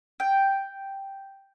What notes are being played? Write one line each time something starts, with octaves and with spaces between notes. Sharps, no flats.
G5